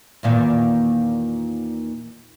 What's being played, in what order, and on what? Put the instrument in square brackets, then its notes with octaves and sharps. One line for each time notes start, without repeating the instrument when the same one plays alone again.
[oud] E2 A#2 D#3